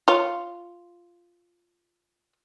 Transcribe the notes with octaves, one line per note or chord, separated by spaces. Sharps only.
F4 C#5